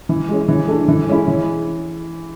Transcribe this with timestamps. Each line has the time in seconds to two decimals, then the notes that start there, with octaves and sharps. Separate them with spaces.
0.09 E3
0.29 G#3 C#4
0.48 E3
0.68 A3 D4
0.88 E3
1.08 G#3 C#4 E4
1.28 E3